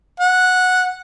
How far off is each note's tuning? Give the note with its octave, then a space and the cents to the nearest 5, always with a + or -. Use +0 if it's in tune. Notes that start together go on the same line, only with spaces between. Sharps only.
F#5 -10